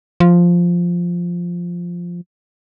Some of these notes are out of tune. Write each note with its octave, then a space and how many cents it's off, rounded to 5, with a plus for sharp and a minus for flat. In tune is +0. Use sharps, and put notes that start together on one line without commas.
F3 +0